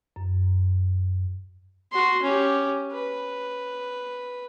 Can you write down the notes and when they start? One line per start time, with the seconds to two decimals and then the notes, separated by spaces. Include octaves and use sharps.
0.16 F#2
1.91 F#4 C6
2.22 C#4 G4
2.92 B4